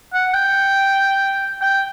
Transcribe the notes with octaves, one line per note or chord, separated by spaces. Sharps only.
F#5
G5
G5